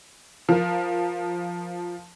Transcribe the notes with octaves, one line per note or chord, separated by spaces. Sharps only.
F3 A#4